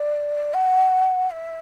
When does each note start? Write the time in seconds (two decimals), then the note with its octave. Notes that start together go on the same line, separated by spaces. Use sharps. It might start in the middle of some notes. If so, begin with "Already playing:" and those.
Already playing: D5
0.53 F#5
1.30 E5